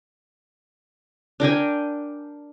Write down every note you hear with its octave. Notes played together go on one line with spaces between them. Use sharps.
D4 A#4 G5 G#5